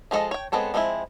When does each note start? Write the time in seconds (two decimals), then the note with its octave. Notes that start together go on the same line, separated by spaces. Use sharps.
0.11 F3 G#3 C#4 A4 D#5
0.31 C#5 G5
0.52 G#3 B3 C4 A4 C#5
0.74 F3 G#3 C4 D4 E4